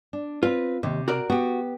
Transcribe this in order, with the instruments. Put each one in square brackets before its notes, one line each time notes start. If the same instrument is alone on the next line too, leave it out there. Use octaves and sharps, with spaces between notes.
[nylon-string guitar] D4
[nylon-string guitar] C4 B4 [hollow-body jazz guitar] F4
[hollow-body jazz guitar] D#2 [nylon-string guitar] C3
[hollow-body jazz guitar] F#4 A#4 D5
[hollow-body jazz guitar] B3 G4 [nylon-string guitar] F#4